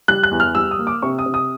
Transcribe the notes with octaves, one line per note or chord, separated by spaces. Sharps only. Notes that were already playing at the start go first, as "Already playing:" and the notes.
G3 F#6
F#6
E2
F6
G3 E6
D#6
A#3
D6
C3 C#6
D#6
C3
D#6